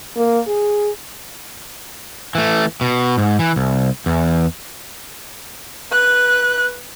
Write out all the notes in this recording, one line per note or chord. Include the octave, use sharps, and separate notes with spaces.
A#3
G#4
E3 A3
B2
G#2
E3
C2
E2
B4 F#6